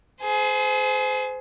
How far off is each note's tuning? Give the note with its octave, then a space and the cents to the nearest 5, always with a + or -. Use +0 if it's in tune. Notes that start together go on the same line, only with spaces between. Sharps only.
G#4 +25 C5 -30